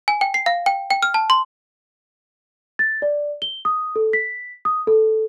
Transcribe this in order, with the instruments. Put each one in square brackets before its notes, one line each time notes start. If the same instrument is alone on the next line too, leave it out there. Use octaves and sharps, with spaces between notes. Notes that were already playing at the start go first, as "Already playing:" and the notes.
[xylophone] G#5
G5
C7
F5
G5
G5
F6
A5
C6
[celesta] A6
D5
G7
D#6
A4
B6
D#6
A4